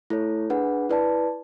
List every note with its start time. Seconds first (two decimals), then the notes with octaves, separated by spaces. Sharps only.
0.10 A3 E4 A4 C#5
0.50 D4 G#4 B4 F#5
0.89 E4 B4 D5 A5